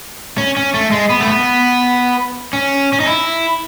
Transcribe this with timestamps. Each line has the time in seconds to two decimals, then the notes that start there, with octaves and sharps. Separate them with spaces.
0.38 C#4
0.57 C#4
0.74 A3
0.92 G#3
1.09 B3
1.20 A3
1.28 B3
2.53 C#4
2.93 C#4
3.00 D#4
3.07 E4